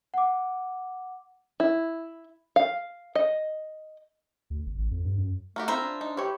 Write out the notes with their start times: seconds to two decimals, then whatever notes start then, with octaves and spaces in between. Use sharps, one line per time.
0.14 F#5 D6
1.60 E4
2.56 F5
3.15 D#5
4.50 D2
4.66 G1
4.78 A1
4.91 F2
5.05 G2
5.18 F#2
5.56 A3 A#3 F#4 G4
5.68 C4 E4 F4 C5 E5 A#5
5.80 D4
6.01 D#4
6.17 E3 G4 C#5